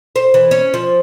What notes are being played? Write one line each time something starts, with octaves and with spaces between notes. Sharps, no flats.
C5
E3
C#4
F3